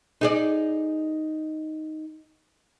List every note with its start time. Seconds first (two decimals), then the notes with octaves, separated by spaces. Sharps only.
0.21 D#4 G#4 D5